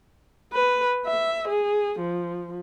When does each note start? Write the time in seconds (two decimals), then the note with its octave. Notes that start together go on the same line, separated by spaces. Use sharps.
0.53 B4
1.06 E5
1.48 G#4
2.00 F3